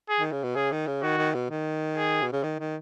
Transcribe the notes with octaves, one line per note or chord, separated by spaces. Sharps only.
G#4
D#3
C#3
B2
C#3 G#4
D#3
C#3
D#3 F#4
D#3
B2
D#3
G#4
B2
C#3
D#3
D#3